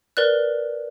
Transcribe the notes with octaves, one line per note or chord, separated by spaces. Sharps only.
A#4 B4 D5 F#6